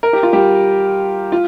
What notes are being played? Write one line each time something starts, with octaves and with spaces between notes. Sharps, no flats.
A#4
G4
F4
G3 G4
F4